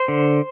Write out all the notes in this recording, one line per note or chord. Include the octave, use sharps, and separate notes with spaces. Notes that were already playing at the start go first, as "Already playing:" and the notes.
Already playing: C5
D3